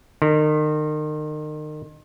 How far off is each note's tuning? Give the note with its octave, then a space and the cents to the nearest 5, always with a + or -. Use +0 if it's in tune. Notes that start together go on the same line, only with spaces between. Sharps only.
D#3 -35